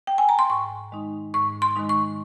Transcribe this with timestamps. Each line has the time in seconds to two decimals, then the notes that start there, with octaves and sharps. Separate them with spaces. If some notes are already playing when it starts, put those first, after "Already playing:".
0.07 G5
0.18 G#5
0.29 A#5
0.39 C6
0.50 G#2 C#6
0.92 D#3 G#3 D#4
1.34 G#2 C#6
1.62 C6
1.76 D#3 G#3 D#4
1.89 C#6